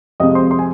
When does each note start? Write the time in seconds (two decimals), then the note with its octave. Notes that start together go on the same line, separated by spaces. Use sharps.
0.20 F2 C3 G#3 D#5 D#6
0.35 C5 C6
0.51 C5 C6
0.59 G#5